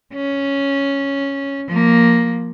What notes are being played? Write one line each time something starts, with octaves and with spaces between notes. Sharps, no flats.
C#4
F3 A#3